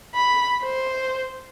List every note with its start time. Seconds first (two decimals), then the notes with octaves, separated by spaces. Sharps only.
0.14 B5
0.63 C5